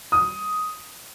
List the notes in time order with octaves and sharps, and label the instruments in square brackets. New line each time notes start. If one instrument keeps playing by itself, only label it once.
[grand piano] D#6